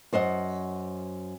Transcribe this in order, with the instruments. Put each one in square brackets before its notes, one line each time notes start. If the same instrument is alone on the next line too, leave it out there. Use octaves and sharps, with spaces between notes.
[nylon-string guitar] F#2 C5 D#5 F#5